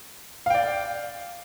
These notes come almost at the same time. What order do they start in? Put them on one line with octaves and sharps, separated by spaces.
F5 G5 D5